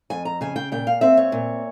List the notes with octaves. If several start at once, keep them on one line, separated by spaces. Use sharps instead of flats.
F2 G#5
A#5
C#3 G#5
G5
A#2 G5
F5
C4 E5
C#5
A#2